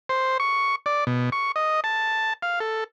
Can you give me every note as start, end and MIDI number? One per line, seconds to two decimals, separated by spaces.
0.09 0.38 72
0.40 0.76 85
0.86 1.04 74
1.07 1.30 47
1.32 1.52 85
1.56 1.80 75
1.84 2.33 81
2.42 2.59 77
2.60 2.84 69